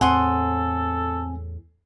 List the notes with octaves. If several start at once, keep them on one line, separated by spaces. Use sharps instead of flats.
E2 A2 C4 A4 F#5 G#5 C6 D#6